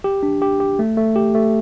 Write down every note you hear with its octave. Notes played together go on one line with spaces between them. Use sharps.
G4
D4
G4
G4
A3
A3
G4
A3